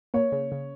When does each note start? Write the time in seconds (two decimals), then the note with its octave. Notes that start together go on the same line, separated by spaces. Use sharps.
0.14 A#3 C#5
0.32 C#3
0.52 C#3